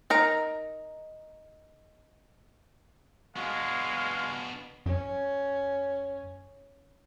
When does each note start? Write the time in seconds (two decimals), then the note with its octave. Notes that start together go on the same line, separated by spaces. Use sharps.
0.10 D#4 A#4 A#5
3.36 G#3 B3 D4 F#4 F5
4.86 F#2 C#4